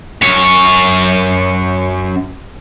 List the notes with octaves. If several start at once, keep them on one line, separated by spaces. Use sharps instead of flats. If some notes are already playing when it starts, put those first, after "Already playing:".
F#2 C#5